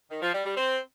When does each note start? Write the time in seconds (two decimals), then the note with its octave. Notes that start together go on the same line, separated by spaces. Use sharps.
0.11 D#3
0.22 F3
0.34 G3
0.45 G3
0.57 C4